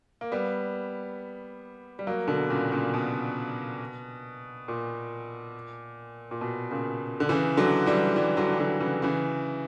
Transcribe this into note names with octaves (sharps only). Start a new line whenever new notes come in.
A#3
G3 B3
G3
F#3 A#3
B2 D3
A#2 C#3
A#2 C#3
B2
A#2
A#2
B2
A#2 C#3
D3
C#3 E3
D3 F#3
E3 G3
E3 G3
D3 F#3
E3
D3 F#3
C#3 E3
C#3 E3